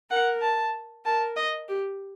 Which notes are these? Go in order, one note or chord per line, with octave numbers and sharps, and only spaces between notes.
A#4 F#5
A5
A#4 A5
D#5
G4